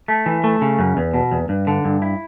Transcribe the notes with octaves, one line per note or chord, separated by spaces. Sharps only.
A3
E3
A3
C#3
F#2
E2
B2
E2
G2
D3
G2
E4